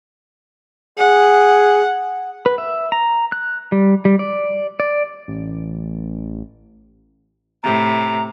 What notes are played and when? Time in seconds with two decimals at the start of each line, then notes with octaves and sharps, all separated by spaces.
0.98 G#4 F#5
2.46 B4
2.58 E5
2.92 A#5
3.32 F#6
3.72 G3
4.05 G3
4.19 D5
4.80 D5
5.28 A1
7.63 A2 C3 A#5